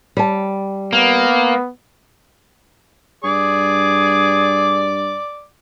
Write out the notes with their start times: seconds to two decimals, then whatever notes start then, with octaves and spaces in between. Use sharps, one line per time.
0.17 G3 A5
0.93 A#3 B3
3.24 G2 G#4 D5 D6